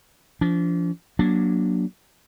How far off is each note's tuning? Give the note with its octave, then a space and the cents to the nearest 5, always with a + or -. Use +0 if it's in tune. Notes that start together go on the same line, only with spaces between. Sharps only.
F3 -25 D4 -35
F#3 +0 A#3 +30 D4 +0